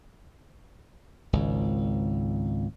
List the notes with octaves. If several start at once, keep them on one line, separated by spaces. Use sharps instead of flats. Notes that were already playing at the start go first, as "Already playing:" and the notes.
G#1 C#2